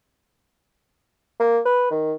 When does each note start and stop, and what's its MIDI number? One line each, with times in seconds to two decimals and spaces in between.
1.40 1.60 58
1.65 1.86 71
1.91 2.13 51